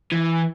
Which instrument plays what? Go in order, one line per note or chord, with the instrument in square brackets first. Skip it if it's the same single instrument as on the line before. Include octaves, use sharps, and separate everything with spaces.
[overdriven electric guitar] E3